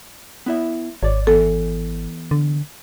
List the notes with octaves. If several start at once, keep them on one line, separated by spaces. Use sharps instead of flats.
B3 E4 E5
G#1 C#5 D5
E3 B3 A4
D3